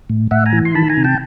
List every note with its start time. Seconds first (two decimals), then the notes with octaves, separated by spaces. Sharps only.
0.10 A2
0.31 A2 E5 F#5
0.46 G#5 A#5
0.53 E3
0.65 C6
0.75 D#3 A5 B5
0.90 G#5 A#5
0.97 C3
1.04 G5 A5